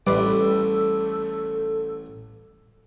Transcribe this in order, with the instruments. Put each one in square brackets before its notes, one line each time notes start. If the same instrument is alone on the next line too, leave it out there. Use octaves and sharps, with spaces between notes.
[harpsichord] A1 D5 [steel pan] G3 B4 [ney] A4